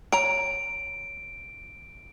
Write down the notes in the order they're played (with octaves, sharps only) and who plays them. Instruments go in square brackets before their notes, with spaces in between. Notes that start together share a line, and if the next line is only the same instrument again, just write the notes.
[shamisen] C#5 A#5 [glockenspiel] D7